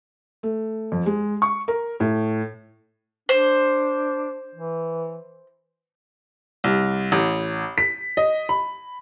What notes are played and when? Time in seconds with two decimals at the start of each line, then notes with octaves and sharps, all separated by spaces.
0.43 A3
0.92 F2
1.06 G#3
1.42 C#6
1.68 A#4
2.00 A2
3.29 D4 C5
4.55 E3
6.64 C2
7.12 A1
7.78 B6
8.17 D#5
8.49 B5